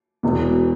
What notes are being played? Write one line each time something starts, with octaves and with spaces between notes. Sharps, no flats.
E1 E2 B2